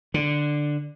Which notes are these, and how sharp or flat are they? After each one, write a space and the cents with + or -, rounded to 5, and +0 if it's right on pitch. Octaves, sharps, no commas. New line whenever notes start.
D3 +5